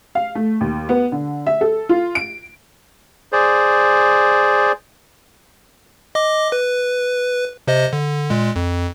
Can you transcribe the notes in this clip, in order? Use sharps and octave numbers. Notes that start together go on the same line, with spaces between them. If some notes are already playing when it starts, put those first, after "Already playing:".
F5
A3
D#2
B3
D3
E5
A4
F4
D7
G#4 C5 D5
D#5 D6
B4
C3 C5 D#5
D3
A#2 G#3
F2